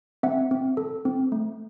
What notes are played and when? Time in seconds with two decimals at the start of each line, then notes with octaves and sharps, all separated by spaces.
0.23 C4 E5 F#5
0.51 C4
0.77 A4
1.05 C4
1.32 A3